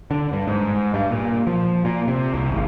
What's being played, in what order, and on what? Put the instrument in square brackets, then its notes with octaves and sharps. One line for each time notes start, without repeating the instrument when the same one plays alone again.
[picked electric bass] D3
G2
G#2
G2
A#2
F3
A#2
C3
C2
G#1